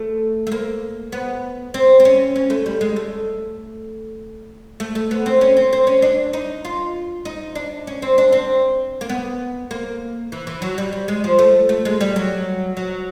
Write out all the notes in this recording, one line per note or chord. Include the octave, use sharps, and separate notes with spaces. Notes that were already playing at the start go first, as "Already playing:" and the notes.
Already playing: A3
A3
A#3
B3
C4
C4
C#4
C#4
A3
G3
G#3
A3
A3
A3
B3
C4
C#4
C4
C4
C#4
D4
D#4
F4
D#4
D4
C#4
C4
D4
C4
A#3
B3
A#3
E3
E3
F#3
G3
G3
G#3
F3
A3
A3
G#3
G3
F#3
F#3